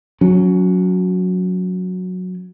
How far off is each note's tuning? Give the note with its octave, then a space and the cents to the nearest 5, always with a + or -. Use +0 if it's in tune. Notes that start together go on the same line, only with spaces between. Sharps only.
F#3 -15 C#4 +20